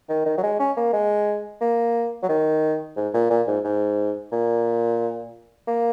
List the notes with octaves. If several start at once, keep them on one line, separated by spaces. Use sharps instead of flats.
D#3
D#3
F#3
G#3
C#4
A#3
G#3
A#3
F#3
D#3
G#2
A#2
A#2
G#2
G#2
A#2
A#3